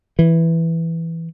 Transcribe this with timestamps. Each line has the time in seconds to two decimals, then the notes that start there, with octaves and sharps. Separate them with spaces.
0.19 E3